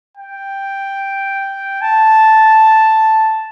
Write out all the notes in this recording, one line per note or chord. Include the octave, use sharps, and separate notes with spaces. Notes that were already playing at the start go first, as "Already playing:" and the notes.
G5
A5